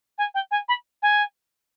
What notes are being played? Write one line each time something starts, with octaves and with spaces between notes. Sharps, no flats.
G#5
G5
G#5
B5
G#5